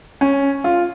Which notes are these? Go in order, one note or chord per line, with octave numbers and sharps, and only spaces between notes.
C#4
F4